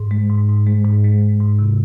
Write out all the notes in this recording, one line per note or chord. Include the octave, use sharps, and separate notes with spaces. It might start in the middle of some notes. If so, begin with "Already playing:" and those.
Already playing: G#2
G#3
G#2
G#2
G#3
G#2
G#3
G#3
G#2
C3